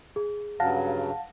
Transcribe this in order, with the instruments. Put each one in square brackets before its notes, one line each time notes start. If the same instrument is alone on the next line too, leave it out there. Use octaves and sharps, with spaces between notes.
[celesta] G#4
[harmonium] G2 C#3 F#3 [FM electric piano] F5 F#5 A5 [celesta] A#6